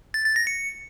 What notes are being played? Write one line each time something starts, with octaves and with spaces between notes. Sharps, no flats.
A6
A6
A#6
C#7